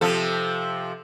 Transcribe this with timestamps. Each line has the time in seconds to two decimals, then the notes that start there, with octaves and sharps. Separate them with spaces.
0.01 C3 F3 A4